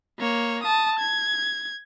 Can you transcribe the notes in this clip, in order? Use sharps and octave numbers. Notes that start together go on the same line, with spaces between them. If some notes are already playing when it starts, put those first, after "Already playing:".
A#3 C#5
A5 D#6
G#6